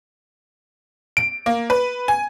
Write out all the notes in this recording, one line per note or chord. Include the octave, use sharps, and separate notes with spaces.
D7
A#3
B4
G#5